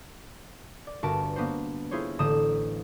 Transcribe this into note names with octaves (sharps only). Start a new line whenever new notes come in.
D5
G1 F#4 A#4 B4 A5 D7
A#3 B3 D4 F#4 C5
E4 F4 G#4 C5 C#5
A1 D3 E3 G4 D#6 E7